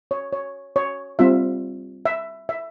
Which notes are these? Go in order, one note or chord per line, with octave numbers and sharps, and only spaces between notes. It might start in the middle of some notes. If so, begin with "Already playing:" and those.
C#5
C#5
C#5
G3 C4 F4 E5
E5
E5